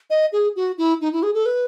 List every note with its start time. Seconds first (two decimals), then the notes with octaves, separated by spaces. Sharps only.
0.10 D#5
0.32 G#4
0.56 F#4
0.78 E4
1.01 D#4
1.13 E4
1.23 G#4
1.34 A4
1.46 B4